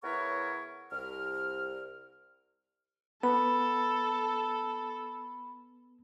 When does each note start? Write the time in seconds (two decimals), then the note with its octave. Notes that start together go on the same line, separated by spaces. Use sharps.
0.04 C#3 B3 E4 A#4 C#5 C#6
0.92 C2 F6
3.23 B3 A4 B5